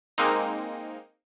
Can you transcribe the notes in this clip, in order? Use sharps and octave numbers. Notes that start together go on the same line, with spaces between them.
G#3 A#3 C4 D#4